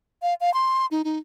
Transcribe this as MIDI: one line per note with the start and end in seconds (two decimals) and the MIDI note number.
0.22 0.34 77
0.41 0.53 77
0.54 0.86 84
0.91 1.02 63
1.05 1.18 63